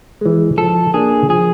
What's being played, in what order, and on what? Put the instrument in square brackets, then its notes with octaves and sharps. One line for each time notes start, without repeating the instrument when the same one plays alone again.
[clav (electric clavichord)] E3 G#3
[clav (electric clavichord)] F3 [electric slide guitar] A4
[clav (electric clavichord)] A#3 D4 [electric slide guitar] G#4
[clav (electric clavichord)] F3 [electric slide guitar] G#4